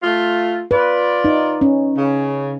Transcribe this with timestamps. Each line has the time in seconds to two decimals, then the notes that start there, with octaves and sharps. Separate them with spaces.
0.03 A3 F4
0.71 F4 B4 D5
1.25 D#4
1.61 C#4
1.98 C#3